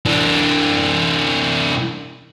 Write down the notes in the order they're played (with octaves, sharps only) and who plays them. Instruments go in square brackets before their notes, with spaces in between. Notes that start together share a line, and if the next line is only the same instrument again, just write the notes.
[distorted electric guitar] E3 D4